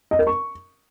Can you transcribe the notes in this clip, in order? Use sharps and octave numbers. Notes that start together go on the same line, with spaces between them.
D#5
A#4
C#6